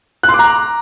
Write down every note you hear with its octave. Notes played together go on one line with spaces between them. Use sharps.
F#6
C6
D6
A#5